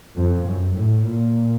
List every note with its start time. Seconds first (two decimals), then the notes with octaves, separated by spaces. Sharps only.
0.16 F2
0.46 F#2
0.76 A2
1.05 A#2